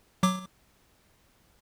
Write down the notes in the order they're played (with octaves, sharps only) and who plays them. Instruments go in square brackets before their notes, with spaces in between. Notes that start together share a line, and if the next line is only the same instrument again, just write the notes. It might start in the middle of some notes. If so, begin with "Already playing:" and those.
[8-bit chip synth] F#3 D6